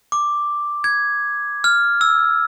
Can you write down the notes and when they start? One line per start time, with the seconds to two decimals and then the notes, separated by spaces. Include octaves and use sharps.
0.12 D6
0.84 G#6
1.64 F6
2.01 E6